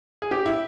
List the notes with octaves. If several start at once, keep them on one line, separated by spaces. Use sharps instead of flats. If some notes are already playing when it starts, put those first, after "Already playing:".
G#4
G4
E4